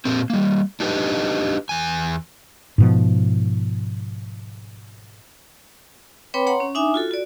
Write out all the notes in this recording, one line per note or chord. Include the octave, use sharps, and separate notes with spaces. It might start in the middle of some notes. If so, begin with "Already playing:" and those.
A#2 A#3 C4
G3 A#3
D4 D#4 G4 B4 D#5
E2 G#5
G#2 B2 F3
C4 B4 C#5 G5 B5 D6
C#5 F#5 A#5 C6
C#4
D4 D#4 E5 G#5 D6 D#6
F4 F#4 A4
F#4 D5